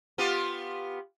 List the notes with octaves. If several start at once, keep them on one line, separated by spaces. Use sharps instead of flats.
B3 F4 G4